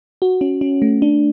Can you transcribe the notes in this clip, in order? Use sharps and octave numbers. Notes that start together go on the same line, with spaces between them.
F#4
C#4
C#4
A3
D4